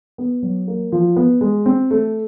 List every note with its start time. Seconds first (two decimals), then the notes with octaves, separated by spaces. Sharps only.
0.18 B3
0.43 F#3
0.68 A#3
0.92 F3
1.16 B3
1.41 G#3
1.66 C4
1.91 A3